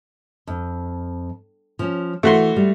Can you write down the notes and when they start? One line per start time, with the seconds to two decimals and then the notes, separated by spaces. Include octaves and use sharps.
0.47 F2
1.79 F3 C#4
2.23 E3 A3 F#4 C6
2.56 G3